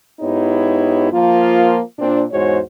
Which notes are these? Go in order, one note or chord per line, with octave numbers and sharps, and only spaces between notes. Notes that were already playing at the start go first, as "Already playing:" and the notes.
G#2 B3 D#4 E4 G4 C#5
F3 A#3 F4
A#2 C4 D4
E2 G#2 G#3 F#4 C5 C#5